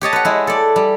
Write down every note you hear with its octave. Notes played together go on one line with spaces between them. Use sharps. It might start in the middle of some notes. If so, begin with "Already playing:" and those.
G4 C#5 D#5 A5
B4 F#5
G#3 E4
A4 D5
G3